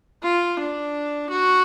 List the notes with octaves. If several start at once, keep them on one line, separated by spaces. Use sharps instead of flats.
F4
D4
F#4